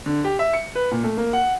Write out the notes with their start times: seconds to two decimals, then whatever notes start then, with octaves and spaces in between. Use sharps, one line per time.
0.06 D3
0.24 G4
0.39 E5
0.53 C#7
0.75 B4
0.91 A#2
1.04 A3
1.17 A#3
1.33 F#5